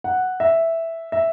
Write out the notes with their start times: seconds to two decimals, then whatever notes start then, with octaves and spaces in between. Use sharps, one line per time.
0.04 F#5
0.40 E5
1.12 E5